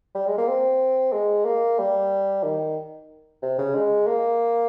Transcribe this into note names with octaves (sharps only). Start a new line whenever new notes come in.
G3
G#3
A#3
C4
G#3
A#3
G3
D#3
C3
C#3
G#3
A#3